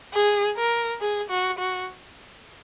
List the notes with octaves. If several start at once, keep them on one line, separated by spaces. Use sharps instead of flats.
G#4
A#4
G#4
F#4
F#4